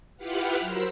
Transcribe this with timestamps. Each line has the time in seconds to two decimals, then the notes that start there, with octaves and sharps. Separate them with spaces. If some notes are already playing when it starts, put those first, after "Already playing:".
0.17 E4 F4 G4 B4 F5 F#5
0.60 F#3 A#4 C5 B5 C6 E6